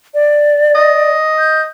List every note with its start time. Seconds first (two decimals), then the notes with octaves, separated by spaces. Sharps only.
0.14 D5
0.75 D#5
1.39 G6